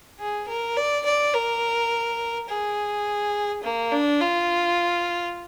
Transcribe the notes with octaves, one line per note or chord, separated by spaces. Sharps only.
G#4
A#4
D5
D5
A#4
G#4
A#3
D4
F4